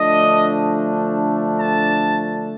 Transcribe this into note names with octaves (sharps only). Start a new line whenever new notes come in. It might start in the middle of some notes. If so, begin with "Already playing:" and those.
Already playing: D3 F3 A3 D4 D#5
A5